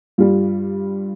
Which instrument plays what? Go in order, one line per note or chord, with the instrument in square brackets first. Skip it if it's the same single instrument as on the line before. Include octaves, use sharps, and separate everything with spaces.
[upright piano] G2 G3 F4